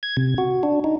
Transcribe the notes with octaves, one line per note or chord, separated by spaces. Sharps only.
G#6
C3
F#4
D4
D#4